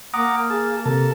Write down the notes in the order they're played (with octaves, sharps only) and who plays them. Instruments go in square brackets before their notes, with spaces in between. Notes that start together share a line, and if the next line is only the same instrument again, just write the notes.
[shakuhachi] A#3 [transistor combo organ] F#5 A#5 D6 [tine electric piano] D#6
[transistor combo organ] G#4 A5
[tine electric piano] C3 [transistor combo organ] A4 A#4 A5